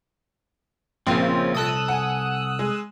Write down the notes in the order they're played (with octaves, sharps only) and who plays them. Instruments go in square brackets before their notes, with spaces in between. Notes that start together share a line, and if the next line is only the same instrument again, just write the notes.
[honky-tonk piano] A#1 [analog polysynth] C#3 C4 [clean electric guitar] F3 A#3 F4
[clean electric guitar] C2 A4 [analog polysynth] D#6 E6 F#6
[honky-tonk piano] F#5 G#5
G#3